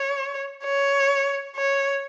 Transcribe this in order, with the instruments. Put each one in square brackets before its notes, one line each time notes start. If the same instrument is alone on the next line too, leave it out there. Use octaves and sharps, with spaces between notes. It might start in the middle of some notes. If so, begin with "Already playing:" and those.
Already playing: [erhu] C#5
C#5
C#5